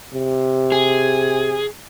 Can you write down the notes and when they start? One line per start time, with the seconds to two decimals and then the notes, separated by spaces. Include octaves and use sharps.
0.14 C3
0.72 G#4